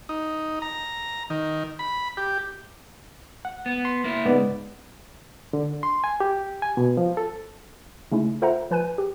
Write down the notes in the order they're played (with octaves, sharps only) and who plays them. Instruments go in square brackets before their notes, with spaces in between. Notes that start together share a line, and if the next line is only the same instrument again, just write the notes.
[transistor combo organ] D#4
A#5
D#3
B5
G4
[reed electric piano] F#5
[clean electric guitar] B3
[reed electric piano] C6
[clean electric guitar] A#3 E4
[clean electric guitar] C#2 [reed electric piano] G#2 B3 D5
[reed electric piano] D3
C6
G#5
G4
G#5
B2
F3
A4
[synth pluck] C#3 A3 C#4 D#4 E4
F4 A4 C5 E5 F#5 A#5
F3 B4 G#5 F#6 D#7
G4